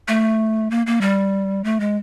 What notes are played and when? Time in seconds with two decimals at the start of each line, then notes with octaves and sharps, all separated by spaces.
0.08 A3
0.71 A#3
0.87 A#3
1.01 G3
1.64 A3
1.80 G#3